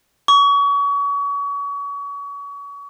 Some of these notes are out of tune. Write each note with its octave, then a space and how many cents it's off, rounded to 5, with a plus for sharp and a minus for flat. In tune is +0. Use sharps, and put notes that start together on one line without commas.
C#6 +35